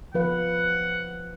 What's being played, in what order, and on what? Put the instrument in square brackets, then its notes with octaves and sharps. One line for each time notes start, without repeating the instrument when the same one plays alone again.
[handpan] F3 B4 F5 [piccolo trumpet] F#5